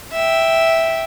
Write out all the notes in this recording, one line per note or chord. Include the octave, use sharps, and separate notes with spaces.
E5 G5